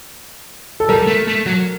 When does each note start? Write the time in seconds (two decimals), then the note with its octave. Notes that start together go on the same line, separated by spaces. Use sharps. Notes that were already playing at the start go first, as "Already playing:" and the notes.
0.80 A4
0.89 G3 A#4
1.07 A3
1.27 A3
1.46 F#3